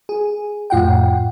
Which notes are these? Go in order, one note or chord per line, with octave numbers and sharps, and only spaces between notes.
G#4
F2 A2 F4 F#5 G5